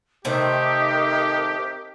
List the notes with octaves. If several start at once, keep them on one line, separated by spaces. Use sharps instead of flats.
C3 D#3 A3 D#4 G4 A#4 E5